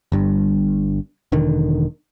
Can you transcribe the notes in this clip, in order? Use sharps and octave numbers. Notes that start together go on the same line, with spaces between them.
G1 G2
E1 D3 D#3